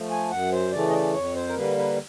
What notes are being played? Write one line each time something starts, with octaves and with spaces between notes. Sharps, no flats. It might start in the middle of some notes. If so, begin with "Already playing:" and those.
Already playing: F3 A3
G#5
F#2 F#5
C5
C#3 E3 A3 D5
D#5
D5
F2 C#5
C5
A#4
D3 G3 A#3 B4
B4